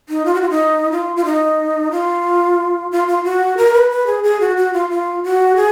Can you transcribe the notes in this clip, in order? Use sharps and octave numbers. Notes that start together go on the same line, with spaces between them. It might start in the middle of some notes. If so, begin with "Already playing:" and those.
D#4
F4
F#4
F4
D#4
F4
F4
D#4
F4
F4
F4
F#4
A#4
B4
B4
G#4
G#4
F#4
F#4
F4
F4
F#4
G#4